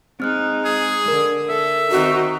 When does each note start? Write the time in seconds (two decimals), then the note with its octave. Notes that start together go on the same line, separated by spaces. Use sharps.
0.20 G#3 C4 D#4 F6 F#6
0.65 G#4
1.08 D3 A#4
1.49 A4 E5
1.91 D#3 C4 D#4 F#4